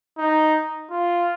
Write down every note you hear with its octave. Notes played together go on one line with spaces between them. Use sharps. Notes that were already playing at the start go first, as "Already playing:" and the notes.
D#4
F4